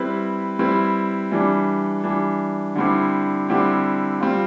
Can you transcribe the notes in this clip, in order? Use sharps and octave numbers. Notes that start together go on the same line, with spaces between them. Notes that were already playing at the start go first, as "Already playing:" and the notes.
Already playing: G3 C4 E4 B4
G3 C4 E4 B4
E3 G3 D4
E3 G3 D4
D3 G3 C4 E4 G4
D3 G3 C4 E4 G4
G3 C4 F4